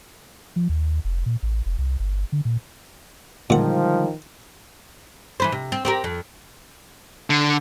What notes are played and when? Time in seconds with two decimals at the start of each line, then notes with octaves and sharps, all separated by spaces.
0.56 F3
0.69 D#2
1.05 F1
1.26 A#2
1.43 A1
1.66 F1
1.78 C2
1.99 G1
2.32 D3
2.45 A#2
3.50 A#2 D3 D#3 F3 G3 G#3 F#5
5.40 E3 B4 C5
5.52 C3
5.72 C4
5.85 C4 G4 A#4
6.04 F2
7.30 D3